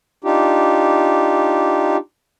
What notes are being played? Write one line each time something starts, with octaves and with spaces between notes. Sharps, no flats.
D4 D#4 F4 G4